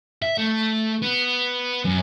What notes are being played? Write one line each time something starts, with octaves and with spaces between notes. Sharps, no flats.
E5
A3
B3
F#2